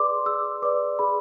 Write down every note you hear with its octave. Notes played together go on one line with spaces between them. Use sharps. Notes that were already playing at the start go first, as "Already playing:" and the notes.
Already playing: G#4 B4 D5 C6 D6
G#4 E6
B4 D5 D6
G#4 B5